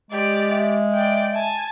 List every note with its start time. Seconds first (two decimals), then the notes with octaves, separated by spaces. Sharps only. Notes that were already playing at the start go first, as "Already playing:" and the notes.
0.11 G#3 G4 D5
0.50 E5
0.93 D5 G5
1.34 G#5 A5